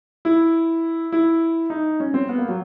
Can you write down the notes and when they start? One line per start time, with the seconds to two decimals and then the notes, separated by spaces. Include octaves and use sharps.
0.25 E4
1.12 E4
1.70 D#4
2.00 C#4
2.14 C4
2.29 B3
2.38 A#3
2.48 F#3